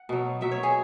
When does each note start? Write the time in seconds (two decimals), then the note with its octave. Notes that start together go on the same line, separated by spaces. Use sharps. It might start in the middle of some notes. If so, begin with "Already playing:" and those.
Already playing: F#5
0.09 B2 F#3
0.41 B2 F#3 E5
0.52 C#5
0.63 G#4